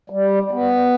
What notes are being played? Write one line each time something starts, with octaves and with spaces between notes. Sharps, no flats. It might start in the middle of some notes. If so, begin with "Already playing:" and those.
G3
B3